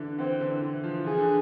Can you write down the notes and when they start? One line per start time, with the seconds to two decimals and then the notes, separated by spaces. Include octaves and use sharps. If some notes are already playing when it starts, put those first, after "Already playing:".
Already playing: D3 E3
0.18 E3 C4
0.40 D3
0.62 E3
0.84 F3
1.06 E3 G#4
1.18 D3